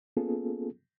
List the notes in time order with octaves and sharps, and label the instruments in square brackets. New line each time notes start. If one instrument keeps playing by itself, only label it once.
[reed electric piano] A#3 B3 C#4 F4 G#4 A4